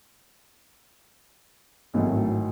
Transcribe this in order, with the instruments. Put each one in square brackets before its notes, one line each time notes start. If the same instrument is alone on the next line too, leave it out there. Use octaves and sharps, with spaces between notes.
[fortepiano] G#1 A2 F#3